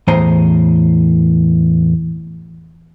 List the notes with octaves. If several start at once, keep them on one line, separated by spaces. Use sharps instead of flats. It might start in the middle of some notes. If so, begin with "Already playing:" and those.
E2 A2 C5 G#5 A#5